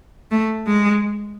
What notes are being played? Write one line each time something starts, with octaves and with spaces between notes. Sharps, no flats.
A3
G#3